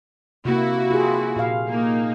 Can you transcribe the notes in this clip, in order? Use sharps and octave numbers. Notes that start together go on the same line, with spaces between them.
C3 A#3 E4 F#4
F4 G4 G#4
A#2 F5
A#3 D#4